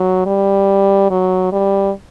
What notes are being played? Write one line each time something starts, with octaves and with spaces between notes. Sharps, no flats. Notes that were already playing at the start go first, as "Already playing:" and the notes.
Already playing: F#3
G3
F#3
G3